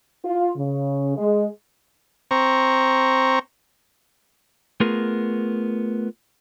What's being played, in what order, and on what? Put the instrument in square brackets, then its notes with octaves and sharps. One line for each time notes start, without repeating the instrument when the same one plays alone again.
[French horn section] F4
C#3
G#3
[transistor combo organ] C4 A#5 C#6
[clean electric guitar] A3 B3 F4 G#4 A#4